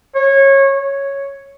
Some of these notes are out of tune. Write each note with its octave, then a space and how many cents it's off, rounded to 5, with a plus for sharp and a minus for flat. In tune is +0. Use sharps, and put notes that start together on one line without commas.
C#5 -20
C#5 -5